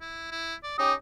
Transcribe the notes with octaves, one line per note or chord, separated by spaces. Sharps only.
E4
E4
D5
C#4 D#4 G4 D#6